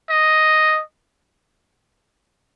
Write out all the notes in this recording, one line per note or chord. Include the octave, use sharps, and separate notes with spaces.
D#5